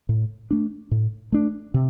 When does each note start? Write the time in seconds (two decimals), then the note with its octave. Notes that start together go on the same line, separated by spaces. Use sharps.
0.09 A2
0.51 A3 D4
0.91 A2
1.32 A3 D4
1.74 C3